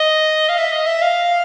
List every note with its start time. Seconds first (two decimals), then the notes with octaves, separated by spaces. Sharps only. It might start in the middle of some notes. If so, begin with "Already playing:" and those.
Already playing: D#5
0.49 F5
0.58 E5
0.72 D#5
0.87 E5
1.02 F5